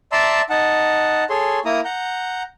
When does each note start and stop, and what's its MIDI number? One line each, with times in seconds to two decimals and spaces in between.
0.12 0.42 74
0.12 0.42 76
0.12 0.42 81
0.12 0.42 82
0.12 0.42 84
0.12 0.42 88
0.50 1.24 63
0.50 1.24 78
0.50 1.24 81
1.30 1.59 68
1.30 1.59 69
1.30 1.59 73
1.30 1.59 84
1.65 1.80 58
1.65 1.80 64
1.65 1.80 82
1.65 1.80 87
1.85 2.43 78
1.85 2.43 82
1.85 2.43 91